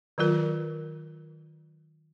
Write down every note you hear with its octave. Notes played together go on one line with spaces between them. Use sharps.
D#3 F#3 F4 A#4